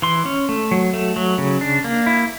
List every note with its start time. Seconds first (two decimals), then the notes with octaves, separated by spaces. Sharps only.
0.02 E3 C6
0.26 C#4
0.49 A3
0.71 F#3
0.93 A3
1.16 F#3
1.38 C#3
1.61 D4
1.84 A#3
2.06 E4